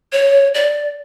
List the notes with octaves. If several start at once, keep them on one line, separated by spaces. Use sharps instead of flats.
C#5
D5